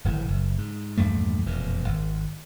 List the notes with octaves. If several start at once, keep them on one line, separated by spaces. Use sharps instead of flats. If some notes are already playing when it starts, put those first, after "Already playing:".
D1 G#1 A2 E3
F#1
G#2
A#1 E2 G2 A3
E1 F2 A#2
G#1